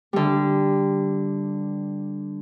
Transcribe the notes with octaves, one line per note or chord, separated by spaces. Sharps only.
D3 G3